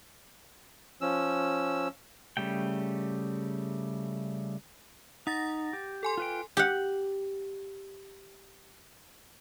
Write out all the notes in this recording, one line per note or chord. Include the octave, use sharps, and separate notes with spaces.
F3 C#4 E6
C#3 G3 A3 G5
D#4 F#5 A6 A#6
G4
A4 G#5 C6
F4 B4 G5
G4 F#5